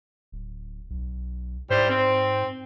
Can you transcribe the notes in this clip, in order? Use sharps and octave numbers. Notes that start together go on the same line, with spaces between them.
D1
B1
G#2 G3 E4 C5
C4